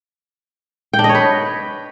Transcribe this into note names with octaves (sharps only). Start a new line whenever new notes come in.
G5
D4
D#5
C#5
B4